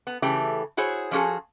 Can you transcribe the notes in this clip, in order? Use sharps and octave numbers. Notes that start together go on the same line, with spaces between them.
B3
C#3 E3 A3 G4
E4 F#4 G#4 C5 C#5
F3 C#4 F#4 G#4 A4